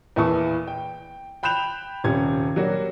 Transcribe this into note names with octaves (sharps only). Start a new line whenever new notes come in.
E2 A#2 E4 A5 C#6
G5
G5 B5 F#6 G6 E7 F7
D#1 C3 G3 C#4 G#6
F#3 G3 A#3 D4 F#4